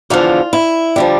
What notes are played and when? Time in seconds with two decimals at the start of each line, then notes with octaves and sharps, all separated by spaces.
0.10 E2 D3 F3 F4
0.53 E4
0.96 D3 F3 G3